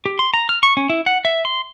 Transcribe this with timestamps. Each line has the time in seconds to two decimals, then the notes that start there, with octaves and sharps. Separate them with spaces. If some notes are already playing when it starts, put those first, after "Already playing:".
0.06 G4
0.19 C6
0.34 A#5
0.49 F6
0.63 C#6
0.77 C#4
0.90 E4
1.06 F#5
1.25 E5
1.45 C6